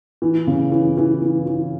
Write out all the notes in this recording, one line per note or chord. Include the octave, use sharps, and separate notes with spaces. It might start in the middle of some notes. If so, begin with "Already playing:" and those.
E3
C#3
E3
E3
E3
E3